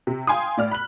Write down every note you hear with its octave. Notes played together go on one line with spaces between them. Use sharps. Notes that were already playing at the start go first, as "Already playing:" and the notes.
C3
F5 G5 G#5 C6 D#6
A2 D5 F6
B5 F#6 F#7